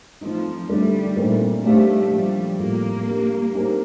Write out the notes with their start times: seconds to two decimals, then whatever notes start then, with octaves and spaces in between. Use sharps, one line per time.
0.21 F3 A3 C4 D#4
0.68 D3 G3 A3 D4
1.16 A#2 A3 C4 D#4 A#4
1.63 G3 A3 D4 G4 C5 F5
2.11 F3 G3 A#3 F4 C5
2.59 A2 G3 A#3 C4 F4 A4
3.06 G3 D4 G4 A#4
3.54 C4 D#4 G4 A#4